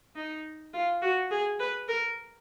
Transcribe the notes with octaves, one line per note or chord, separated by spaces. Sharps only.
D#4
F4
F#4
G#4
B4
A#4